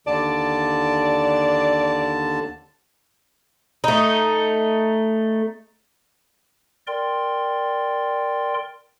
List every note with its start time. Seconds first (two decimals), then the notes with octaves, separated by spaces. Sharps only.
0.07 D#2 D3 D5 A5
3.84 A3 D#4
6.87 A#4 D5 G5 C6